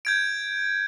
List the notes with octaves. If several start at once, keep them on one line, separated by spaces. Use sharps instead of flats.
G6 G#6 D7